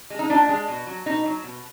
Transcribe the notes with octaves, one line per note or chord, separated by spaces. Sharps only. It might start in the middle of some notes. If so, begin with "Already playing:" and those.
G#3
D#4
A#2 D4
G#3
B2
F#3
B2 D#4
F#3
B2